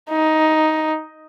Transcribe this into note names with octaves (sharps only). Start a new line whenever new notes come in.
D#4